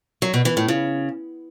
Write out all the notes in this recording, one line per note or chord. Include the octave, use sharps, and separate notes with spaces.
F#3
B2
E3
A2
C#3